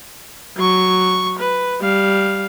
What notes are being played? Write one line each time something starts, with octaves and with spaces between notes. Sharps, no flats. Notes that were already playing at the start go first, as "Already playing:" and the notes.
F#3 C#6
B4
G3 F5